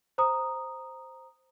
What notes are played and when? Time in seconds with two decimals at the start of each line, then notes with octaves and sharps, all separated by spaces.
0.18 C5 A#5 D#6